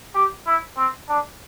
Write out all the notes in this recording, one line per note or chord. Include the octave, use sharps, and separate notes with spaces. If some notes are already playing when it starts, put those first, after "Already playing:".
G4
E4
C4
D4